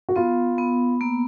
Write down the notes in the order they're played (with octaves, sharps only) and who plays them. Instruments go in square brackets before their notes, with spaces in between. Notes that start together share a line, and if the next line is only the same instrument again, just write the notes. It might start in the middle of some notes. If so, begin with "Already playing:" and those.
[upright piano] F#4
[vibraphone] B3 [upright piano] F4
[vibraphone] B3
A#3